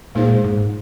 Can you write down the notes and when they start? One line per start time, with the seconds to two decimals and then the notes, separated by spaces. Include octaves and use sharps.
0.15 A#2 G#3 D#4 G#4 C5
0.44 G#2